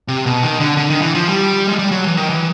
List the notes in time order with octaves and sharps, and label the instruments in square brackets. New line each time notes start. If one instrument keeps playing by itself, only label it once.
[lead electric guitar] C3
B2
D#3
D3
D3
D#3
E3
F3
G3
G#3
G3
F#3
E3
D#3
E3